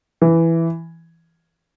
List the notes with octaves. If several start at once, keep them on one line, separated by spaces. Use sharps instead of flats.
E3